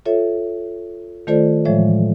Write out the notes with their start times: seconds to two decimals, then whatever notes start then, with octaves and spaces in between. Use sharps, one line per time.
0.06 F4 A4 C#5 E5
1.27 D#3 A3 F4 A4 C5 D5
1.65 A2 E3 F3 G#3 C#5 E5